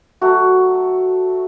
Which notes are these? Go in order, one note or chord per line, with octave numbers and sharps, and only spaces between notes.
F#3 A3 F#4